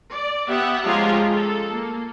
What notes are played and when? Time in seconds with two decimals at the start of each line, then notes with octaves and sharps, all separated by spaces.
0.13 D5
0.48 B3 G4 E5 F#5
0.84 F3 G#3 C#4 F4 G4 A#5
1.33 A4
1.72 A#3